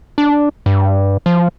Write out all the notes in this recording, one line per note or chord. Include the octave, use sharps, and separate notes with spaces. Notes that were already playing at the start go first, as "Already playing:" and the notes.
D4
G2
F3